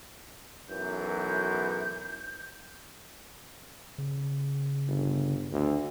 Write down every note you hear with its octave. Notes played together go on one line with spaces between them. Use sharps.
B1 F#2 E3 G6
C#3
G1
D2